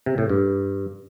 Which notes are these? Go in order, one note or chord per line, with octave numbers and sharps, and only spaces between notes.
C3
A2
G2